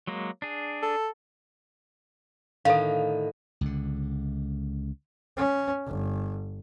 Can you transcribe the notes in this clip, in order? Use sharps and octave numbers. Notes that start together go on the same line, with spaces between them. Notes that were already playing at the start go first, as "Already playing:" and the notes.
F#3 G#3 A#3
D4 G#4
A4
A2 D3 D#3 A4 F5
C#2 D3
C#4
G1